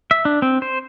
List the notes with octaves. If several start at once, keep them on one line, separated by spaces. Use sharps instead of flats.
E5
D4
C4
C5